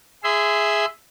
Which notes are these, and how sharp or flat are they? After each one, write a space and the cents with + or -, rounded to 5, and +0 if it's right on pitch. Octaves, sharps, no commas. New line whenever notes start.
G#4 +0 E5 +0 C6 -30